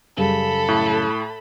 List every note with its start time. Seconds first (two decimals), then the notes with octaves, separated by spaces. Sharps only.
0.17 F#2 C#3 G3 A4 B5
0.68 A2